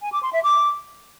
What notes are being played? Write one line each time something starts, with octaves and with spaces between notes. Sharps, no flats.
G#5
D6
C6
E5
D6